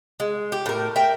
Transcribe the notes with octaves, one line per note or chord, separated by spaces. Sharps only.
G#3
G4
A2 A#4
A#4 E5 G5